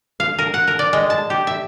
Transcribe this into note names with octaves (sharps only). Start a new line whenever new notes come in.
F5
A#4
F#5
A#4
D5
G#3
A5
G4
E5